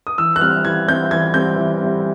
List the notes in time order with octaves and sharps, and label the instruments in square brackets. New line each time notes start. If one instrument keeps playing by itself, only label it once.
[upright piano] D#6
E3 E6
F#6
G3 C4 F6
E3 G#6
G3 C4 G6
E3 G#6
G3 C4 G6
E3
G3 C4